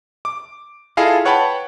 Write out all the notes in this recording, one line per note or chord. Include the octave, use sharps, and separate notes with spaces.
D6
E4 F4 G#4 A4 D#5 F5
B4 C#5 F#5 G5 A5 B5